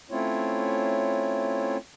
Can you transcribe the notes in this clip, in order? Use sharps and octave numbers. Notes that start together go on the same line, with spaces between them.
A3 C4 C#4 E4 F4 C#5